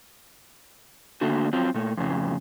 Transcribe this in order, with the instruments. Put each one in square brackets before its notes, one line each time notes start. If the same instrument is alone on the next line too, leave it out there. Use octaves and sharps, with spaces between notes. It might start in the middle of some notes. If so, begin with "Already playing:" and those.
[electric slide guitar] D3 A3 A#3 D4 F#4
F#3 C4 F4
A#2 A3
F2 A2 C#3